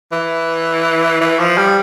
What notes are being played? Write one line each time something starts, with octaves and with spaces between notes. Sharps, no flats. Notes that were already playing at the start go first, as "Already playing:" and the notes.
E3
E3
F3
G3